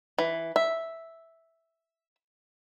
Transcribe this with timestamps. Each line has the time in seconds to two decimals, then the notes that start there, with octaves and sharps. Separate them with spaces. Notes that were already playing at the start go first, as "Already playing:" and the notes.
0.18 E3
0.56 E5